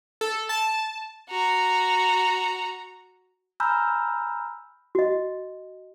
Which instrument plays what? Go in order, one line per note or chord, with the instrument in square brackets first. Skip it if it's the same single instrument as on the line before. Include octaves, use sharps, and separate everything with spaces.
[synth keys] A4
A5
[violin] F#4 A#5
[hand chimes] G#5 A#5 B5 E6 F6 G6
[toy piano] F#4 D#5